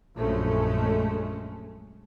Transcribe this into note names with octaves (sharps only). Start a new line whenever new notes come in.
A#1 F#2 G#3 A3 C#4